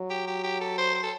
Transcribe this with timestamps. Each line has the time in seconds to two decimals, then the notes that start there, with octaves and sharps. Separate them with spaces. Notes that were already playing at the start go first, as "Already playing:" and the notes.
Already playing: F#3
0.10 G4
0.27 G4
0.43 G4
0.61 A4
0.78 C5
0.95 C5
1.03 A4